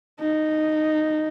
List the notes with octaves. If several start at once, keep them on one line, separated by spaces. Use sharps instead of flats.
D#4